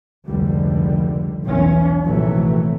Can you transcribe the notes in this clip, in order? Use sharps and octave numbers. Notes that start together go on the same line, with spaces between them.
F1 C#2 D3 G3
B1 E2 E3 C#4
A#1 G#2 C3 E3 F#3 A3